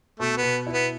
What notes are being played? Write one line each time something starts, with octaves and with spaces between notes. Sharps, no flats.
B2 A3
B3
B2
E4
B3